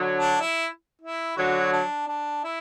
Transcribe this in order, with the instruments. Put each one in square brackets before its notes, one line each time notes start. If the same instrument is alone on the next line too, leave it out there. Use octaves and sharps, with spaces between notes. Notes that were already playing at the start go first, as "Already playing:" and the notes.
Already playing: [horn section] D3 F#3
[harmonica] D4
E4
E4
[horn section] D3 F#3 [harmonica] F#4
[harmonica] D4
D4
E4